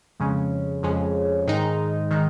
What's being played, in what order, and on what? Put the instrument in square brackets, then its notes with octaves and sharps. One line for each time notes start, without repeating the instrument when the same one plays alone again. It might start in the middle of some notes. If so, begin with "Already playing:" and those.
[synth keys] F2 C#3 G#3 C#4
F2 C#3 G#3 C#4
G#2 D#3 G#3 D#4
D#3 G#3 D#4